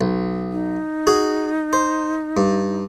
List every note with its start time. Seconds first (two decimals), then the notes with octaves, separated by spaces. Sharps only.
0.01 B1
0.52 D#4
1.07 F#4 G#4
1.73 C5
2.37 G2